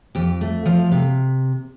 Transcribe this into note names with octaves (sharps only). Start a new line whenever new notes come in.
F2 G4
A3
F3 F5
C3